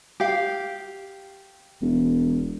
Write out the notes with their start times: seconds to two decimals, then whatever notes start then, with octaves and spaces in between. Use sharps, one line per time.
0.20 G4 F5
1.82 E1